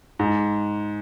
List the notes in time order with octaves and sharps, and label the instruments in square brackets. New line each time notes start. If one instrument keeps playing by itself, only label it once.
[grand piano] G#2